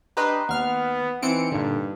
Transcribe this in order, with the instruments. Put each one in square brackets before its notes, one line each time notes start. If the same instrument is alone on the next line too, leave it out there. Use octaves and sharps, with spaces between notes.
[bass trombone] D4 [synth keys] G4 B4 D#5 [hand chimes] A#5 C6 F#6
[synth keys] D#2 F6 [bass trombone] B3 [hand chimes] F#5
[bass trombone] E3 [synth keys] C4 C#7 D7 [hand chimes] D#4
[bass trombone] G2 [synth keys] A#2 D3